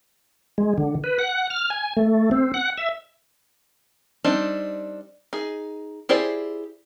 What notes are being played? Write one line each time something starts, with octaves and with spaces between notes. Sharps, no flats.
G#3
D3
B4
F#5
F6
G#5
A3
C4
F#5
E5
G3 C4 D4 D#4
D#4 G#4
E4 G4 G#4 C5 D5